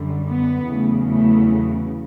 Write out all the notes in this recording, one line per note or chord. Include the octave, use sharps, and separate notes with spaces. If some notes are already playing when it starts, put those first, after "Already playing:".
Already playing: F#2 D3 G3
B3
E2 C#3 F#3 A3
A3